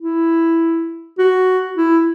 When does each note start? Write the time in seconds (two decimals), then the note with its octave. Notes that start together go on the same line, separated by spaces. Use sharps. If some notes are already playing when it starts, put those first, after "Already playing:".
0.01 E4
1.19 F#4
1.77 E4